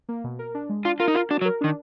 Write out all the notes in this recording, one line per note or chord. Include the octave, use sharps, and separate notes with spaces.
A#3
B2
A#4
D4
G#3
D4 F4
F4 A#4
D#4
F4 A#4
D4 F#4
F#3
A#4
D#3 D4